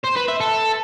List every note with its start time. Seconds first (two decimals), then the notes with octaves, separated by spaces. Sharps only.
0.05 C5
0.17 B4
0.29 E5
0.40 A4